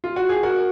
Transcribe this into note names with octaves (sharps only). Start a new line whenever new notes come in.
F4
F#4
G#4
F#4 A#4